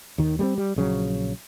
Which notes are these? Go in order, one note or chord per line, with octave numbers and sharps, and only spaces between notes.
D#2 D#3
G3 G#3 C4
G3
A#1 C#3 F#3